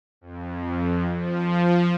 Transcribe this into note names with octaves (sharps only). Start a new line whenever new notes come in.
F2
F3